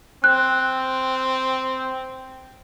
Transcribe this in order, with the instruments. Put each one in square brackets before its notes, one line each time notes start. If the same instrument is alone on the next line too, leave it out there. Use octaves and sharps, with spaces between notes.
[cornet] C4 [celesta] F#6